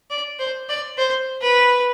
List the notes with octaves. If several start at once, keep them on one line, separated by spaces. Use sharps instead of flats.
D5
C5
D5
C5
B4